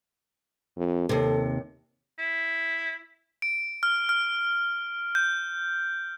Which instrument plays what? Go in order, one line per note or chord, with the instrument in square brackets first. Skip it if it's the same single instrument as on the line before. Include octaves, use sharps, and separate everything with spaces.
[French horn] F2
[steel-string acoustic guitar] D#2 C3 [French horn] A4
[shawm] E4
[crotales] D7
F6
F6
G6